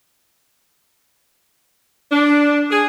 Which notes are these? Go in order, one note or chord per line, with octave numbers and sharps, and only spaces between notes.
D4
G#4